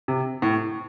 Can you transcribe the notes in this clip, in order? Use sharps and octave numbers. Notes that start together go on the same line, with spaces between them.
C3
A2